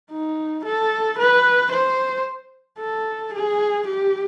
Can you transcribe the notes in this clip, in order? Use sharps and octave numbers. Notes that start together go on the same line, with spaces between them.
D#4
A4
B4
C5
A4
G#4
G4